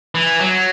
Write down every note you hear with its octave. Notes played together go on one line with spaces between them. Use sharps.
E3
F#3